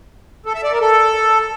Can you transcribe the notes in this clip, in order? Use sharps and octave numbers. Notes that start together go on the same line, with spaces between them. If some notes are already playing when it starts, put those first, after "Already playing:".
A4
E5
D5
A#4
A4